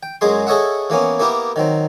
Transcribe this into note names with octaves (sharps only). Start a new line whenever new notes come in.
G5
F#2 F#3 G#3 G#4 C6
G#4 A4 C#5 D#5 E5 F#5
E3 A#3 B3 C#4
A#3 B3 E4 G4 A#4
D#3 F#3 C4